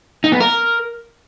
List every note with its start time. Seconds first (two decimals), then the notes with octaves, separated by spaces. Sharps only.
0.24 D#4
0.32 B3
0.40 A#4